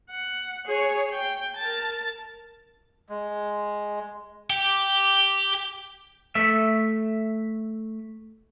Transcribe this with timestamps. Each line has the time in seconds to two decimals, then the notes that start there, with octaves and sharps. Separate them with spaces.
0.10 F#5
0.66 G#4 C#5
1.13 G5
1.57 A#4 A5
3.09 G#3
4.50 G4
6.35 A3 E5